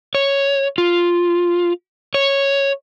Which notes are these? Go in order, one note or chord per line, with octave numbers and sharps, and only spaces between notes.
C#5
F4
C#5